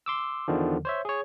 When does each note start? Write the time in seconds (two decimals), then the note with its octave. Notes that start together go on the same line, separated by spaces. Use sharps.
0.06 C6 D6 E6
0.48 E2 D3 D#3 F3
0.85 C5 C#5 E5
1.05 G#4 C#5